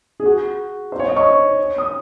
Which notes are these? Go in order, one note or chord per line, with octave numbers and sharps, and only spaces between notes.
G#4
F#4
C5
C#5
D#5
C#6
D#6